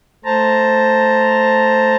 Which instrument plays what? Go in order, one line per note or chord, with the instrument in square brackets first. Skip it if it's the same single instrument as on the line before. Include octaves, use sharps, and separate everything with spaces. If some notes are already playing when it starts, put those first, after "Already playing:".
[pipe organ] A3 C5 A5 A#5